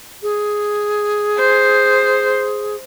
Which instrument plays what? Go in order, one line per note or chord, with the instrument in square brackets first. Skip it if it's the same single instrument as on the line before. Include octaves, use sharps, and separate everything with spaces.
[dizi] G#4
[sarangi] C5